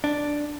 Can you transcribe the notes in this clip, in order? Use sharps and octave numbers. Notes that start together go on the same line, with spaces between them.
D4